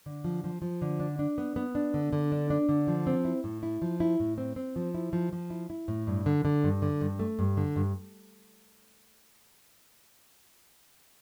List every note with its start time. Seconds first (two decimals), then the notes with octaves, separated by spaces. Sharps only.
0.06 D3
0.24 F3
0.44 F3
0.62 F3
0.82 D3
1.00 D4
1.19 D4
1.38 B3
1.56 B3
1.75 D4
1.94 D3
2.13 D3
2.32 D4
2.50 D4
2.69 D3
2.88 F3
3.07 C4
3.25 E4
3.44 A2
3.63 E4
3.82 F3
4.00 E4
4.20 A2
4.38 C4
4.56 C4
4.76 F3
4.94 E4
5.13 F3
5.33 F3
5.50 E4
5.70 E4
5.88 A2
6.07 G2
6.26 D3
6.45 D3
6.64 G2
6.82 D3
7.01 G2
7.19 A3
7.39 G2
7.57 D3
7.76 G2